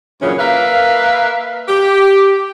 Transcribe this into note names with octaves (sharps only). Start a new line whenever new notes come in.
G2 A#2 C#3 E3 F#3 C#4
A#3 A#4 B4 E5 F5
G4